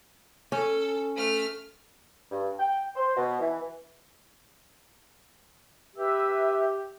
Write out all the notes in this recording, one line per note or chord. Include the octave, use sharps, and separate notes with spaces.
C#4 A4
A3 F6
G2
G5
C5
B2
E3
G4 B4 E5 E6